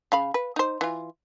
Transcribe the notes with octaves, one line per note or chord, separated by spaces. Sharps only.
C#3 F5 B5
B4
D#4 C5
E3 F4